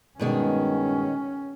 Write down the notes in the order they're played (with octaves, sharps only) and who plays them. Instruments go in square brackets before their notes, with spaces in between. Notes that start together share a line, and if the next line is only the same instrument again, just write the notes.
[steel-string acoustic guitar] G2 B2 G#3 [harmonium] D#3 [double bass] C#4